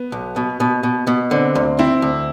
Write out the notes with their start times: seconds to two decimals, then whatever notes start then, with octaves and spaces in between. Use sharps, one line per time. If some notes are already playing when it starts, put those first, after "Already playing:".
Already playing: B3
0.12 B1
0.36 B2
0.60 B2
0.83 B2
1.07 B2
1.31 D3 C4
1.55 D2
1.79 C4 E4
2.02 D2